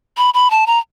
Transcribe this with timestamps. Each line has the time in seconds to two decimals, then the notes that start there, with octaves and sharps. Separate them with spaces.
0.17 B5
0.34 B5
0.51 A5
0.67 A#5